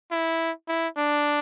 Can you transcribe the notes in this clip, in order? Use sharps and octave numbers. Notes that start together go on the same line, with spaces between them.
E4
E4
D4